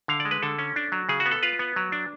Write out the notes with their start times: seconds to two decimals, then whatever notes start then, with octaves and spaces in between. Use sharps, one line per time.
0.08 D3 F5
0.20 D5
0.25 G#3
0.31 B4
0.42 D3 A4
0.59 C#4
0.76 D4
0.92 F#3
1.09 C#3 G#4
1.20 F#4
1.26 B3
1.31 A4
1.43 F4 B4
1.59 B3
1.76 F#3
1.92 D4